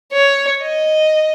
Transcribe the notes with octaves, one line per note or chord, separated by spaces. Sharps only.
C#5
D#5